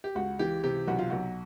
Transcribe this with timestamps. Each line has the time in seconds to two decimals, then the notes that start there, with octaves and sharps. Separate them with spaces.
0.04 G4
0.15 C#2 F#4
0.39 E3 G4
0.64 C3 G4
0.88 B1 F#4
0.99 F4
1.10 B1 F#4